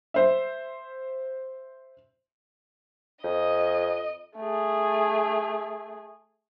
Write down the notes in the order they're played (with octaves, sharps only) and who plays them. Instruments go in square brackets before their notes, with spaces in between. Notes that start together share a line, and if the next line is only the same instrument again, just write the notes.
[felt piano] C5 E5
[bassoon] F2 [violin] D#5
[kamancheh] A3 G#4